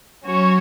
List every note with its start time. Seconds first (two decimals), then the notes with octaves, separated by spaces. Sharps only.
0.24 F#3 C#4 F#4 C#5